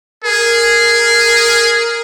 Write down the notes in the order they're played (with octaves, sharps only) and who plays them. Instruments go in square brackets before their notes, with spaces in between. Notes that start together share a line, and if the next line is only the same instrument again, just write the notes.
[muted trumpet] G#4 [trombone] A#4